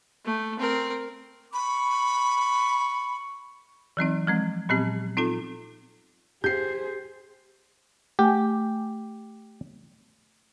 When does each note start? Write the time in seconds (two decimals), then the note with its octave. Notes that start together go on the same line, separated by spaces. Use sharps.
0.25 A3
0.59 C4 A#4
1.54 B5 C#6
3.97 E3 F#3 C4 D#4
4.27 F3 G#3 C4
4.69 A#2 F#3 B3 C4 G4
5.17 C4 D#4 F4 A4
6.44 G4 G#4 C5 G6 C7
8.19 A3 G4 G#5